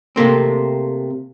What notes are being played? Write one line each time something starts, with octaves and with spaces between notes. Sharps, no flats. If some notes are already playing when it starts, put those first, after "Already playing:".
C3 A3 A#3 C4